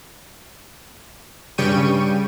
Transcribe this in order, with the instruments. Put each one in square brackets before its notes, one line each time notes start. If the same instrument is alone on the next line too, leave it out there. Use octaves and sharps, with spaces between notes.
[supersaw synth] G2 C#3 G3 G5 C#6 D#7